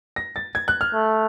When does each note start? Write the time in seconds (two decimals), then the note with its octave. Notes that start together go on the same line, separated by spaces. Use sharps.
0.16 A#6
0.36 A6
0.55 G#6
0.68 F#6
0.81 F6
0.94 A3